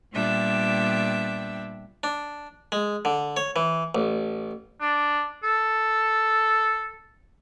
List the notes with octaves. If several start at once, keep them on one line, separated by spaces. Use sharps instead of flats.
A#2 G3 B3 D4 E5 G5
D4
G#3
D3
C#5
E3
A1
D4
A4